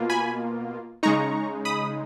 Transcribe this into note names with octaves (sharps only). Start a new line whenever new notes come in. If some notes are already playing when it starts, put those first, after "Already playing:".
Already playing: B2 A#3 F4
G#5 B5
C#3 G#3 D#4 A#5 C#6
B5 D#6